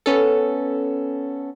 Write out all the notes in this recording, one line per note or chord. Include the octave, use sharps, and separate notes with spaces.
B3 C#4 A4